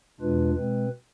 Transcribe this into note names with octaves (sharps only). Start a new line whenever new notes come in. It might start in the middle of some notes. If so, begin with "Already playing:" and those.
E2 B2 G#3 D4 F4 B4
B2 G#3 C4 B4